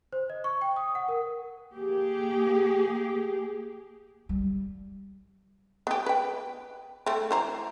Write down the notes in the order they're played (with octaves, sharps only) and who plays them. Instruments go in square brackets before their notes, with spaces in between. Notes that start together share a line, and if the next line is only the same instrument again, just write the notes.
[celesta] C5
D#5
C#6
G5
D#6
F#5
A#4
[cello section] A#3 G4 G#4
[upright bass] G3
[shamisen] B3 G4
B4 G5
A3 C4
E3 C5 A#5